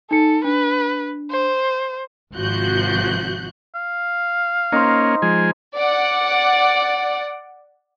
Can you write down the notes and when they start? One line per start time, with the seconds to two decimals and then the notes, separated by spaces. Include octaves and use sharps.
0.11 D#4 A4 C#7
0.44 D4 B4
1.31 C5
2.34 G#1 C3 F3 F#4 F#6 G6
3.75 F5
4.72 A#3 C#4 D#4 C5
5.22 F3 G#3 G#5
5.77 D5 F#5